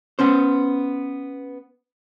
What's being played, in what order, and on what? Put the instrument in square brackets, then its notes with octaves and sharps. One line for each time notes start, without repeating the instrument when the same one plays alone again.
[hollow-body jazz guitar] B3 C#4 C5